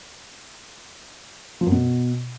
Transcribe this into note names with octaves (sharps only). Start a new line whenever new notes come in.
F3
F#2
B2